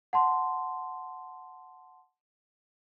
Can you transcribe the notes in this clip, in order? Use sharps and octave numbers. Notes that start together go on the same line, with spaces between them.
F#5 A5 C6